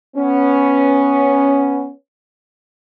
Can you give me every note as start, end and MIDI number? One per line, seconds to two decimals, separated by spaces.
0.16 1.90 59
0.16 1.90 61